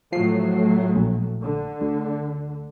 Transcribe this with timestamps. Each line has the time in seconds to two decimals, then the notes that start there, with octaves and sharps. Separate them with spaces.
0.12 A2 F3 F#3 A3 C7
0.96 A#1
1.45 D3
1.81 D2